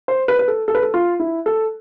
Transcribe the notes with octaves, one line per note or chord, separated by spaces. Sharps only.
C5
B4
B4
A4
A4
B4
A4
F4
E4
A4